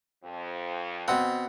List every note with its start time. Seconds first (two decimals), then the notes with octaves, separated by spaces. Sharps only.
0.24 F2
1.08 B2 C4 F#5